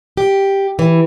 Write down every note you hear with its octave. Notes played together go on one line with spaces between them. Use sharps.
G4
E3